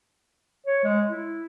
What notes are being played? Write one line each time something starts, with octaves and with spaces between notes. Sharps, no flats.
C#5
G#3
E4